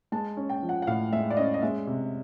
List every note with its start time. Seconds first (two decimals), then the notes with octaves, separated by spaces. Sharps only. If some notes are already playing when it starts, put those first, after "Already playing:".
0.12 G#3 A5
0.37 C#4
0.49 G5
0.63 F3
0.69 F#5
0.82 F#5
0.87 A2 F5
1.13 G#3 E5
1.30 D5
1.37 C#4 D#5
1.54 D#5
1.62 G#3 E5
1.87 C3